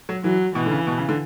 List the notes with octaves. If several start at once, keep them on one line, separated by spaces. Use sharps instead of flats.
F#3
E3 F#3
B2 E3
D3
C#3
B2
C#3
D3